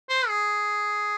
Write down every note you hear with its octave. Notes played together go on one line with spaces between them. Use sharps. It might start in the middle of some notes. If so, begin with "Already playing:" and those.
C5
G#4